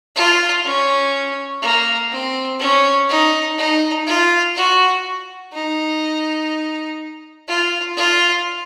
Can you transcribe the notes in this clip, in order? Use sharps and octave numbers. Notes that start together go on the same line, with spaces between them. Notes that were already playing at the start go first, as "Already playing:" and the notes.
F4
C#4
A#3
C4
C#4
D#4
D#4
F4
F#4
D#4
F4
F4